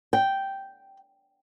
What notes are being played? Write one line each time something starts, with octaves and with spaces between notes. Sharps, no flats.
G5